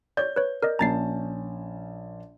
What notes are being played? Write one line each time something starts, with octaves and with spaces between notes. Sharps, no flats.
C#5 D5 G6
B4 C#5
A#4 D5 D#5
A#1 C#4 A5 A#5 A6 C7